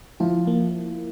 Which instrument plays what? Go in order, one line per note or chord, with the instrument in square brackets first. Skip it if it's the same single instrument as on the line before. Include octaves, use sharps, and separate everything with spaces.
[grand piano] F3 [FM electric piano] E4
[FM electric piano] A#3